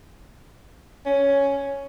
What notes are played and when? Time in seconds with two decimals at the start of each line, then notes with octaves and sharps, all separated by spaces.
1.06 C#4